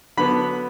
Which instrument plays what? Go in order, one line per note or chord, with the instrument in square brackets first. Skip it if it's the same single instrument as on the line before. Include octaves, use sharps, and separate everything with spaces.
[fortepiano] D3 F#3 B3 B5